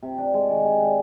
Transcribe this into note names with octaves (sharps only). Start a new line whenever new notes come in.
C3
D4
G#3
D#3
C3
D4